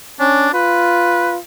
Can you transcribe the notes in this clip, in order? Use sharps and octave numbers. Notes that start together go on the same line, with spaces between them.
C#4 D4
F4 B4